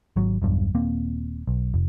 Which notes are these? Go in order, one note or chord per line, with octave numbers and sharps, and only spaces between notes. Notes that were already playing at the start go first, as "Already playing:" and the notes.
G#1 F#3
E1 B1 G2
D#1 A#3 C4
B1
F1